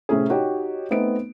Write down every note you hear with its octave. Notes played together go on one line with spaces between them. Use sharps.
A2 C3 A3 C#4 E4 G#4
D#4 F#4 G4 C#5 G5
A3 B3 C4 D#4 D7